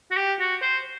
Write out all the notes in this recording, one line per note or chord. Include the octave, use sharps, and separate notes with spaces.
F#4
G4
F#4
C5